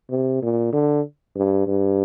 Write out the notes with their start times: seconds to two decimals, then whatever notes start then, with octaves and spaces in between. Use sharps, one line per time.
0.10 C3
0.42 A#2
0.73 D3
1.36 G2
1.67 G2